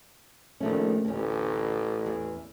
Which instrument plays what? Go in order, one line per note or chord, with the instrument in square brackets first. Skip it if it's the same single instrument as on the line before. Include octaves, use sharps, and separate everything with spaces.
[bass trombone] A#1 [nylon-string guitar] D#3 A3 C#4
[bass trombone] A1 [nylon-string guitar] D2 C#4
[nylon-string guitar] E2